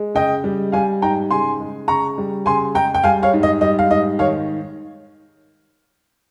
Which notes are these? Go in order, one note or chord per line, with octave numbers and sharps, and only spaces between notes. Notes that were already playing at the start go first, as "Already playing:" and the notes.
Already playing: G#3
C#3 D#5 G5
G3
G3 F5 G#5
G#2 G5 A#5
C#3 G#5 C6
G#3
C#3 A#5 C#6
G3
C#3 G#5 C6
G#3 G5 A#5
G5
G3 F5 G#5
C#5 F5
G#2
D#5
G3 D#5
F5
G#2 D#5
D#3 C#5 F5